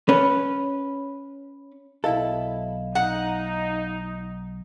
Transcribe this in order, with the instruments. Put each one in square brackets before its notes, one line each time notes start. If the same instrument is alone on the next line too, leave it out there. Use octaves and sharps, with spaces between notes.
[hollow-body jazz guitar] C#4 B4
[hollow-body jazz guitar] B1 E4 A4 [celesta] D#5 F5
[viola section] D#4 [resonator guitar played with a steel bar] F#5